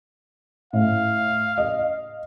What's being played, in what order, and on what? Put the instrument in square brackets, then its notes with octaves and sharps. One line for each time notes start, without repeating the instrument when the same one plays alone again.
[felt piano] A2 [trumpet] F5
[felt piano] D#5